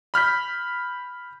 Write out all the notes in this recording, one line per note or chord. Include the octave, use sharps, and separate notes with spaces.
B5 F6 G6 B6